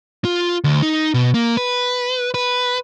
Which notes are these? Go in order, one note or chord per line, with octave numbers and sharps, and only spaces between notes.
F4
D2
D#4
B2
A#3
B4
B4